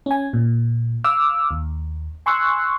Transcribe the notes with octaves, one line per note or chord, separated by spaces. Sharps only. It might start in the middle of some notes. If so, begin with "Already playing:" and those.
C#4 G#5
A#2
F5 D6 E6 F6
D#2
G#5 C6 C#6 E6 F#6